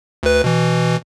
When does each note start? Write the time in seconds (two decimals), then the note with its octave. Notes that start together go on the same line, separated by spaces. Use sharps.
0.23 D2 B4
0.44 B2 E3